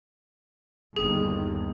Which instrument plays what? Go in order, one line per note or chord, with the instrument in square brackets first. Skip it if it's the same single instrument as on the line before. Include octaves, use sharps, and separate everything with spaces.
[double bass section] G1 D#2 [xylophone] G#4